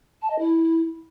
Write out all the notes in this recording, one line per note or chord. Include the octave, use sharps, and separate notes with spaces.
A5
D#5
E4